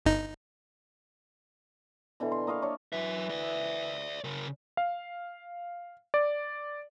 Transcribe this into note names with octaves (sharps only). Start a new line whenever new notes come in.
G1 D#4
B2 D3 E3
C6
A#3 D#5 F5 C#6
D4 C#5
E3 F#3 E5
D5 E5
C#3 A#4
F5
D5